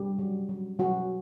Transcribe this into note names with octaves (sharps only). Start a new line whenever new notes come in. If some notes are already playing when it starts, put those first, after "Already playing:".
Already playing: G3 G4
F#3
F#3
F#3 F#4